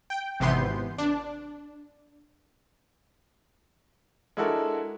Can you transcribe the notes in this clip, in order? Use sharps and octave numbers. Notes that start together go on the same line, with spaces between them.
G5
G#1 C3 E3 B3 C6 G6
D4
G#3 D4 E4 F#4 A4 A#4